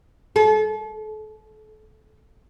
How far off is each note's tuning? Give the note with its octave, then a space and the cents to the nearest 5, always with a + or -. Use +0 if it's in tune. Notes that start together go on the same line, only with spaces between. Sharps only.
A4 -35